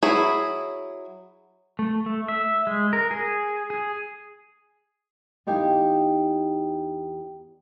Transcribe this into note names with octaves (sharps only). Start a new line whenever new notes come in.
F#3 E4 G#4 B5
A3
A3
E5
G#3
A#4
G#4
G#4
E2 D#4 G4 F5 G#5